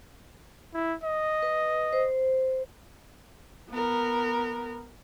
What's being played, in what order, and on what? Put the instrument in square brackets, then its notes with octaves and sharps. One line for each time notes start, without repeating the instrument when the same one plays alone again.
[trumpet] E4
D#5
[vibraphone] B4
C5
[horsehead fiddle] B3 A#4